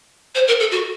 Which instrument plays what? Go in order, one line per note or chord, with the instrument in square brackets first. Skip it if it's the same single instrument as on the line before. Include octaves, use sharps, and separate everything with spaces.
[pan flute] C5
A#4
A4
F#4